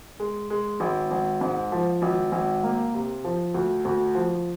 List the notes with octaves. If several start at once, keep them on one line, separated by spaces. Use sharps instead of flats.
G#3
G#3
G#1
G#1
G#2
F3
G#1
G#1
A#3
C3
F3
D2
D2
F3